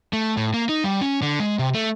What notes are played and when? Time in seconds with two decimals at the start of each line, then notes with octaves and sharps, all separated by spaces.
0.13 A3
0.37 A2
0.54 A#3
0.69 D#4
0.84 G3
1.01 C#4
1.22 D3
1.40 G#3
1.59 C3
1.74 A3